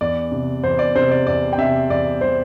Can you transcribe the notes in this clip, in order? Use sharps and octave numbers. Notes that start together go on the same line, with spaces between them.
E2 D5
C3
E2 C5
D5
C3 C5
D5
E2 D5
G5
C3 E5
E2 D5
G3 C5